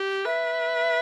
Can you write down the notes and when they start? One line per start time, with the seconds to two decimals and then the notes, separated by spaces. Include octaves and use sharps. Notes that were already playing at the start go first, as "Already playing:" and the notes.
Already playing: G4
0.25 B4 E5